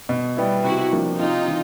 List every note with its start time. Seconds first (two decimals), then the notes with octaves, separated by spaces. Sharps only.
0.09 B2
0.37 G3 B3 E4
0.64 C3 E4 F#4
0.92 F3 A#3 D4
1.19 C3 D#4 F4
1.48 E3